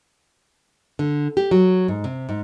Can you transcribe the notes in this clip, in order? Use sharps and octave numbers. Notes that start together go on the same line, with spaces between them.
D3
G4
F#3
G#2
C3
G#2